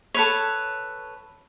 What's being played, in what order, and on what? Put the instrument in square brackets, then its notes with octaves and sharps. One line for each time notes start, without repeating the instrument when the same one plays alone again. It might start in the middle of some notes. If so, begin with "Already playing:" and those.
[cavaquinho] A4 B4 C#5